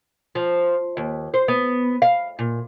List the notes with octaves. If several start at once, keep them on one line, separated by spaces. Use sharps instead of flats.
F3
D#2
C5
B3
F5
A#2